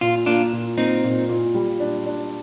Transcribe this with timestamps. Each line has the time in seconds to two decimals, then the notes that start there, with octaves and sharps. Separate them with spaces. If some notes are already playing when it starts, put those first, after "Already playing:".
0.01 A#2 F4
0.26 A#3 D4 F4
0.53 A#2
0.78 A#3 C4 D#4
1.04 A#2
1.29 A#2
1.55 G3
1.80 D4
2.06 D4